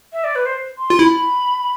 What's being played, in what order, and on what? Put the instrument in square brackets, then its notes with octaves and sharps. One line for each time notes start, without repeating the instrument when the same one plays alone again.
[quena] E5
D5
B4
C5
C6
[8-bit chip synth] F4
[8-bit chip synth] E4 [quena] B5